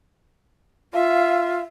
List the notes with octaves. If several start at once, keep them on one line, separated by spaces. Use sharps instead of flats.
F4 E5 F5